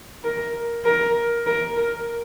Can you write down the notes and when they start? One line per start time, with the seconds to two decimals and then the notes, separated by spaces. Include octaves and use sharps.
0.24 A#4
0.85 A#4
1.46 A#4
1.77 A#4